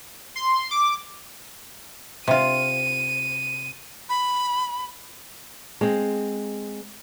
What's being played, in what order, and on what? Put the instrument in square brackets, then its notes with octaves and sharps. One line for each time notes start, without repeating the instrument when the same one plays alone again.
[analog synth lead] C6
D6
[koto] C3 F4 [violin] D#7
[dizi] B5
[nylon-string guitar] G#3 C4